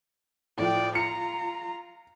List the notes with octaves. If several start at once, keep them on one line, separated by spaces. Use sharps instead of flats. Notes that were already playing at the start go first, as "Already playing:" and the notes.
A2 F3 D5 G5
F4 A#5 C#7